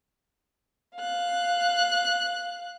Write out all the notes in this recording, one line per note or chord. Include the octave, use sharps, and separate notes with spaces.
F5 F#6